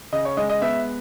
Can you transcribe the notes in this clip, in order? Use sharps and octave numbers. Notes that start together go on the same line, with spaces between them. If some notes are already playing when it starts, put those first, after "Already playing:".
C#3 D#5
C#5
G#3 D#5
D#5
B3 E5